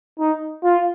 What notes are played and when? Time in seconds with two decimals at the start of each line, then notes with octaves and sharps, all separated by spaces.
0.19 D#4
0.64 F4